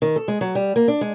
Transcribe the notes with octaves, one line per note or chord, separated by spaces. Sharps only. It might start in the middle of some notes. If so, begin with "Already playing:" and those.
D#3
A4
G#3
F#3
G3
A#3
D4
G#3